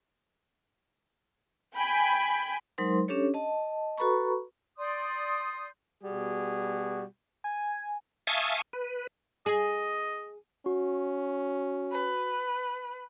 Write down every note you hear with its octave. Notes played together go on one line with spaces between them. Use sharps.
G5 G#5 B5
F#3 G#3 D#4 A#4 C5 C6
C#4 D4 G4 A4 C#5
D#5 A5
F#4 A4 B4 A#5 B5 C#6
D5 C6 D#6 G6
B2 G3 F#4 G#4
G#5
E5 F5 G#5 A5 C#6 D#6
B4
G#4 D#5
C#4 F#4
B4